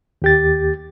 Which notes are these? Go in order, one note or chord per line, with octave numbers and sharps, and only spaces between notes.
D#2 G4 A6